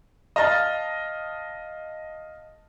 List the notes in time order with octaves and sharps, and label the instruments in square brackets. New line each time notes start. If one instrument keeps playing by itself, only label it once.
[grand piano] D#5 F5 A5 F6 A6